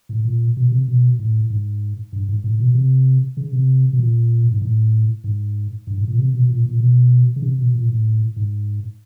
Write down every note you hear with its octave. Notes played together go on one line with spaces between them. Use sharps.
A2
A#2
B2
C3
B2
A2
G#2
G2
G#2
A2
B2
C3
C#3
C3
B2
A#2
G#2
A2
G#2
G2
G#2
A#2
C3
B2
A#2
A#2
B2
C#3
C3
B2
A#2
A2
G#2